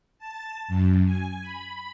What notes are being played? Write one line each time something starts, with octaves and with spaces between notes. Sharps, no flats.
A5
F#2
G#5
B5